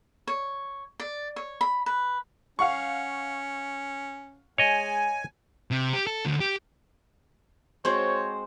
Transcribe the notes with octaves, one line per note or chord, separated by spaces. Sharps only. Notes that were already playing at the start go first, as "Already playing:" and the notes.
C#5
D5
C#5
B5
B4
C#4 F5 F#5 C#6
G#3 C#5 D#5 G#5
C3
G4
A4
D2
G4
G#3 C4 F#4 C5 C#5